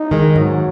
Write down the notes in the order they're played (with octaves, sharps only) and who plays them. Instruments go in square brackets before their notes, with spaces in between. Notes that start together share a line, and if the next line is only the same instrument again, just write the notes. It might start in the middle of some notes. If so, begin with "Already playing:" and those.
Already playing: [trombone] D#4
[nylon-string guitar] D#3 G#3
[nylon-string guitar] G#2 [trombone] F#3